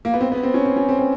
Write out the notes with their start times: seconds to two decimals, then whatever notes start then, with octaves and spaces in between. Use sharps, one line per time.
0.05 A#3
0.14 B3
0.21 C4
0.32 B3
0.43 C4
0.54 C#4
0.66 C4
0.76 C#4
0.89 C4
0.99 C4